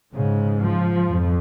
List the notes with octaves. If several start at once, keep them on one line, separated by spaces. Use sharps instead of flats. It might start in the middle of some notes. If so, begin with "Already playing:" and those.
G#2 C#3
F3
F2